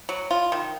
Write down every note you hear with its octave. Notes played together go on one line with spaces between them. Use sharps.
F#3
F4
D#3